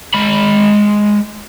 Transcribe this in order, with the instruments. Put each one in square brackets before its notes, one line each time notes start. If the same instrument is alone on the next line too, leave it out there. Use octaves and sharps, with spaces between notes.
[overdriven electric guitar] G#3 B5